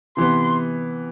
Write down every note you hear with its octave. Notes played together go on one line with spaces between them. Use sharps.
C3 E3 B3 C6